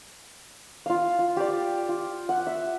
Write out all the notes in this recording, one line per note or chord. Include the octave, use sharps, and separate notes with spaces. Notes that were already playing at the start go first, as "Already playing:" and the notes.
F4 F5
F4
G4 D5
F4
F#5
E5